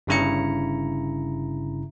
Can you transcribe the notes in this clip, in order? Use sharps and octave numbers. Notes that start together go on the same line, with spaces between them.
G1 G2 C#3 E4 A#5 C#7